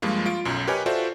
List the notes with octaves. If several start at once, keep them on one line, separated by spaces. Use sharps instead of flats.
G2 F3 G3 G#3 A#3 F4
F4 D7
B1 F#2
G4 A#4 B4 C#5 D#5 G#5
F4 F#4 A4 C5 D5 E5